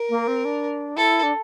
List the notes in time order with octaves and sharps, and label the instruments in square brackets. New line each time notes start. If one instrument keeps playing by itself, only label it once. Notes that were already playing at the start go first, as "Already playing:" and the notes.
Already playing: [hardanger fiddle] A#4
[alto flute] A#3
C4
D4
[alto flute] E4 [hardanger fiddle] A4
[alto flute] D4